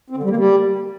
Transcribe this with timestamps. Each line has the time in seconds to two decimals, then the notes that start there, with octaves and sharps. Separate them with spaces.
0.10 C4
0.17 D3
0.23 G3
0.30 A#3
0.36 G3